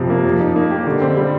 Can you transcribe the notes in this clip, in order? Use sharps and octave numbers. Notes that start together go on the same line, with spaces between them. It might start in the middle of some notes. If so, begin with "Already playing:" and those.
Already playing: F2 C3 F3
A#3
F3
D#4
A#3
G4
D3
C4
G3